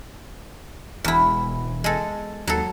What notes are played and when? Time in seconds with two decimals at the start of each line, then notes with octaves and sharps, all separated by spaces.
1.04 E1 E2 E4
1.84 G#3 A4
2.47 D#2 F#3 A4